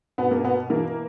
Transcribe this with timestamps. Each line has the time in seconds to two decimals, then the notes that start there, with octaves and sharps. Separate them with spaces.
0.18 B2 B3
0.31 A#3
0.44 B2 B3
0.70 E3 A#3